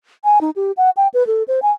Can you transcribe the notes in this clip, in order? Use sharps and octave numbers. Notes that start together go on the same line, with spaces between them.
G#5
D#4
G4
F#5
G5
B4
A4
C5
G#5